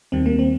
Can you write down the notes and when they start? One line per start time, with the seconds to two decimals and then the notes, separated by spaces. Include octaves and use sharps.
0.12 D#2 D#3 G3 C4
0.26 A#3
0.39 C4